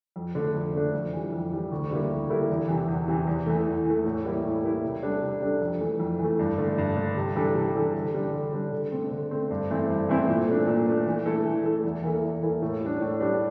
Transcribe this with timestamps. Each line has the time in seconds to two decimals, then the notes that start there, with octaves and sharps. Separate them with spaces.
0.16 F2
0.35 D3 A3 D4
0.55 F2
0.74 D3 A3 D4
0.93 F2
1.13 E3 G3
1.32 F2
1.51 E3 G3
1.72 D2
1.91 D3 G3 A#3 E4
2.11 D2
2.30 D3 G3 A#3 E4
2.49 E2
2.68 C3 E3
2.88 E2
3.08 C3 E3
3.27 E2
3.46 E3 A3
3.66 E2
3.86 E3 A3
4.05 A2
4.25 G3 A#3 E4
4.44 A2
4.64 G3 A#3 E4
4.83 C3
5.03 G3 D4 A4
5.22 C3
5.41 G3 D4 A4
5.61 F2
5.80 E3 A3
6.00 F2
6.19 E3
6.24 A3
6.39 G2
6.58 D3 A3
6.78 G2
6.97 D3 A3
7.17 C3
7.36 E3 G3 D4 A4
7.55 C3
7.75 E3 G3 D4 A4
7.95 D3
8.14 G3 D4
8.33 D3
8.53 G3 D4
8.72 D3
8.92 A3 C4
9.11 D3
9.31 A3 C4
9.51 G2
9.70 E3 A3 C4 E4
9.90 G2
10.09 E3 A3 C4 E4
10.28 A#2
10.47 A3 D4
10.67 A#2
10.86 A3 D4
11.06 E3
11.26 A3 E4 A4
11.45 E3
11.64 A3 E4 A4
11.84 E2
12.03 E3 A#3 E4 A4
12.23 E2
12.43 E3 A#3 E4 A4
12.62 A2
12.81 G3 D4
13.01 A2
13.21 G3 D4